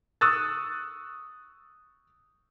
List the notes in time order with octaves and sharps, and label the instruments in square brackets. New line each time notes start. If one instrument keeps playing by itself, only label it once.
[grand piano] C#6 D#6 E6 F#6 A6